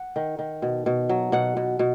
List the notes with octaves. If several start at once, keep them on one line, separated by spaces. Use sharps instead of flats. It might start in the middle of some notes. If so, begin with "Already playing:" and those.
Already playing: F#5
D#3
D#3
B2
B2
F#3
B2 F#5
B2
B2